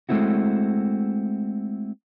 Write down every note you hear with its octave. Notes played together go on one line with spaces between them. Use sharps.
G#3 A3 C4 E4 F#4